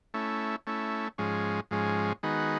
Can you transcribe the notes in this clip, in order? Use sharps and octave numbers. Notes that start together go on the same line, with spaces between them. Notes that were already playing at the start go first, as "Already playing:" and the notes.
A3 C#4 E4
A3 C#4 E4
G#2 F3 G#3 C#4
G#2 F3 G#3 C#4
D#3 G#3 B3 D#4 F#4